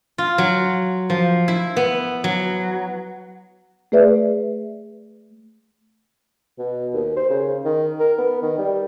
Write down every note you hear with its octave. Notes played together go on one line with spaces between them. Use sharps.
F4
F#3
F3
E4
B3
F#3
A3 G#4 B4 D5 E5
B2
D#2
C5
C#3
D#3
A#4
B3
D#3
G3